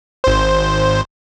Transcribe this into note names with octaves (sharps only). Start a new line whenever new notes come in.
G#1 C5